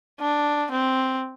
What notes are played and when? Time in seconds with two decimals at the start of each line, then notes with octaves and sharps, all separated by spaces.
0.20 D4
0.71 C4